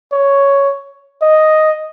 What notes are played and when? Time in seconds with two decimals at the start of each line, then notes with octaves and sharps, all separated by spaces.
0.12 C#5
1.22 D#5